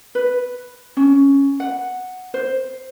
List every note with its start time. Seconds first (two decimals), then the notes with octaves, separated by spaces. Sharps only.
0.15 B4
0.97 C#4
1.60 F#5
2.34 C5